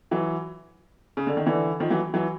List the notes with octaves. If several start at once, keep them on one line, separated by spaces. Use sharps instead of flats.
E3 F#3
C#3
D3
D#3
D3 E3
D#3 F3
E3 F#3
E3 F#3